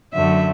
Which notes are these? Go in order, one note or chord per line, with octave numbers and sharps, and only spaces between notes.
F#2 D3 F#3 A3 E5